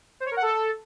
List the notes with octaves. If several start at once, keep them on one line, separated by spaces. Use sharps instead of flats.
C5
C#5
A#4
F#5
A4